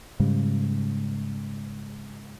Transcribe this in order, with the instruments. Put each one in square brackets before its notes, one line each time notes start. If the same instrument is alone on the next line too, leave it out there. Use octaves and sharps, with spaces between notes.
[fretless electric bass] G#2 C#3 G3